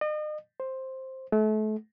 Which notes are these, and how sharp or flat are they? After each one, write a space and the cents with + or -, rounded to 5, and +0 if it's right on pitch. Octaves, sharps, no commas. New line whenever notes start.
D#5 -40
C5 +10
A3 -35